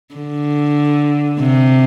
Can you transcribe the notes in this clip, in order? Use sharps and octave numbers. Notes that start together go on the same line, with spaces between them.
D3
C3